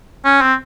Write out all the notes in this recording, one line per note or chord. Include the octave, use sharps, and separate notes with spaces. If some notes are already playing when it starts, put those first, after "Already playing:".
C#4
C4